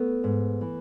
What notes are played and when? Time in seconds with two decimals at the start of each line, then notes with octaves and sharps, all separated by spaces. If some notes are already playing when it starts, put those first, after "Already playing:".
Already playing: A3 B3
0.24 G#2
0.61 E3